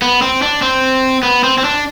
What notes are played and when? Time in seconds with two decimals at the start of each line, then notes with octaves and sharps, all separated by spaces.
0.02 B3
0.22 C4
0.42 D4
0.62 C4
1.23 B3
1.44 C4
1.58 C4
1.64 D4